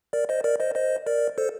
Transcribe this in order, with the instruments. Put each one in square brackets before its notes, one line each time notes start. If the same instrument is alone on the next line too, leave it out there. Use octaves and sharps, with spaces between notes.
[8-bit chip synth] A#4 D5
C5 D#5
A#4 D5
C5 D#5
C5 D#5
A#4 D5
A4 C5